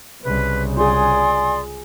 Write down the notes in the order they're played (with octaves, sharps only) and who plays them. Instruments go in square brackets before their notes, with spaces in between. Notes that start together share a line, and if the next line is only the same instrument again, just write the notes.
[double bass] C2 C#3 [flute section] B4
[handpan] F4 G#4 [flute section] D5 C6 D#6 [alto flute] G#5